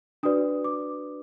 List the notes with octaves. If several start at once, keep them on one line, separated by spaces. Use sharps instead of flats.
D4 F#4 B4 D5 D#6
D6